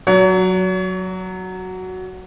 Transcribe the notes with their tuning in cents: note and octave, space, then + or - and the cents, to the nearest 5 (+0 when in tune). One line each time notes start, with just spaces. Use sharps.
F#3 +0 C#5 +40